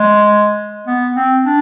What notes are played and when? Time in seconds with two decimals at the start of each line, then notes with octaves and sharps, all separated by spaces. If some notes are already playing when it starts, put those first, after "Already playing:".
Already playing: G#3
0.87 B3
1.16 C4
1.45 D4